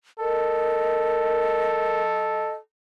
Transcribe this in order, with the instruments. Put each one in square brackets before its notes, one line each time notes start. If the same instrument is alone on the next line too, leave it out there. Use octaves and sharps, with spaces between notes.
[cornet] A4 [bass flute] A#4 [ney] D#5